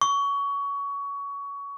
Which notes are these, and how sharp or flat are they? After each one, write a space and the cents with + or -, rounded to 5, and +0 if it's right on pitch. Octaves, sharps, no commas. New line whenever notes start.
C#6 +20